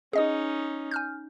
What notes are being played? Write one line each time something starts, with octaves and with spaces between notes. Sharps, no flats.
C#4 D#4 G#4 D#5 D#6
G#5 F6 G6